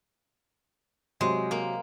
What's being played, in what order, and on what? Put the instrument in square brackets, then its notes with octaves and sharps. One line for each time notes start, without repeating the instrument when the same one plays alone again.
[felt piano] C3 F#3 [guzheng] G#3
[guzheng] A#3